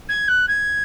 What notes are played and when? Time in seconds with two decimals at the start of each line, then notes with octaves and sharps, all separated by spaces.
0.09 G#6
0.28 F#6
0.48 G#6